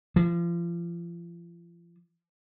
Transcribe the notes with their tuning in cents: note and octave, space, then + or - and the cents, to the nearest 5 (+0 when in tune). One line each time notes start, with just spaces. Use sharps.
F3 -35